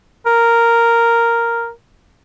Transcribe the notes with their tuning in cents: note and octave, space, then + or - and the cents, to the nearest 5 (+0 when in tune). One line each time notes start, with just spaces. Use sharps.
A#4 -5